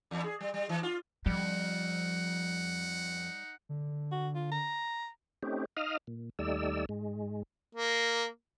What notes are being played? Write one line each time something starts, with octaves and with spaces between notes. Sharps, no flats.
E2
G#4
G3
G3
E3
F4
F2 F3 G3 D#4 F#5
D3
F#4
F4
A#5
A3 C4 C#4 D#4 G4
D#4 D#5 F5 D#6 F6
A#2
D#2 G3 A3 D#4 D5 E6
G#2 G#3
A#3